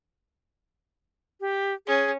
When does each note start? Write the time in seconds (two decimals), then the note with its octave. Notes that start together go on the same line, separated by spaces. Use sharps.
1.41 G4
1.87 C#4 G#4